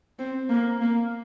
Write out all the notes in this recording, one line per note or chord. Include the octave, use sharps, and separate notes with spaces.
C4
A#3
A#3